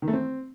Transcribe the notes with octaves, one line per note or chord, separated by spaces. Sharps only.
D#3
A3
C4